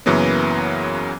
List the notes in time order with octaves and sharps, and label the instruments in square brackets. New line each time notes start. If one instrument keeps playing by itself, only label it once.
[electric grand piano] F#2 C#3 E3 F#3 A#3 B3